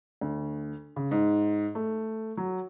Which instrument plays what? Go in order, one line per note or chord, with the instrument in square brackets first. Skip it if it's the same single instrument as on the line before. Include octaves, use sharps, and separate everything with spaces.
[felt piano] D2
C#3
G#2
A3
F#3